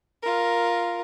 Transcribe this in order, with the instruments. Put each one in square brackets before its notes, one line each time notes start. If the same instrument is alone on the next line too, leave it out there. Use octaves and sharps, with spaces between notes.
[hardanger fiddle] F4 A#4